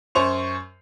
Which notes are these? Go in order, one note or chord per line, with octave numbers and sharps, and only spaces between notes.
F#2 C5 C#6 F7